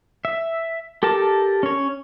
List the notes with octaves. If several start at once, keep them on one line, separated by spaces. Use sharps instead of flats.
E5
G4 A4 A#4 A5
C#4 C#5